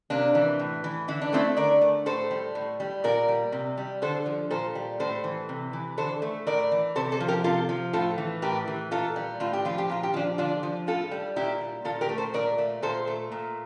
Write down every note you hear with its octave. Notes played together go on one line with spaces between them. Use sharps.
C3 A#3 D4
E3
A2
E3
D3 E4
D4
A3 C4 E4
D3 A#4 D5
A3
A2 A4 C5
G3
A2
G3
A#2 A#4 D5
G3
C3
G3
D3 A4 C5
F3
A#2 A4 C5
G3
A2 A4 C5
E3
C3
E3
D3 A4 C5
A3
A2 A#4 D5
E3
C3 A4 C5
A4 C5
F3
G4 A#4
C3 F4 A4
F3
A2 F4 A4
E3
A2 G4 A#4
E3
A#2 F4 A4
G3
A2 F4
G4
F3 F4
G4
A#2 F4
G4
F3 D4 F4
D3 D4 F4
F3
A2 F4 A4
G3
A#2 E4 G4
G3
A#2 F4 A4
G4 A#4
A3
A4 C5
A#2 A#4 D5
A3
A#2 A4 C5
A3
A#2